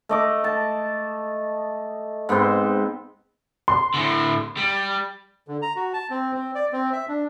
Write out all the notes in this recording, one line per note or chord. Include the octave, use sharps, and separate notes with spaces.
A3 D#5 D6
A5
G#2 B3 C4 C5
C6
A2 D3
G3
D3
A#5
F#4
A5
C4
C4
D5
C4
E5
D4